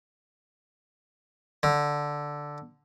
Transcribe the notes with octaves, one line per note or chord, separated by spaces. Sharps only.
D3